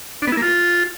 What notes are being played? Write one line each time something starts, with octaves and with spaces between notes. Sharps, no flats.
D4
B3
E4
A#3
F4